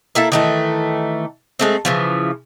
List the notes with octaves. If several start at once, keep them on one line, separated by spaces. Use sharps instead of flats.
A#3 E4 A4 E5
D#3 E3 A3
G#3 A3 C4
C#3 E3 F3